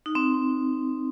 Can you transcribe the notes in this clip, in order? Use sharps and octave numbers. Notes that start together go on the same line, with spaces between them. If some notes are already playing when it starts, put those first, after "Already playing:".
D#4
C4